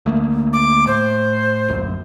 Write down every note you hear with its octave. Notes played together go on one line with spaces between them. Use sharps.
D2 A3 A#3
D6
A2 C5
D1 A#1 F#2